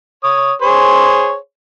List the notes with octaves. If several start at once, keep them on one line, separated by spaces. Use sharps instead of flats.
C#5 D#6
G#4 C5 C#5